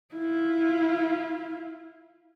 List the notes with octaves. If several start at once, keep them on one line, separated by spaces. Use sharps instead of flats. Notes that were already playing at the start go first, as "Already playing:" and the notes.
E4 F4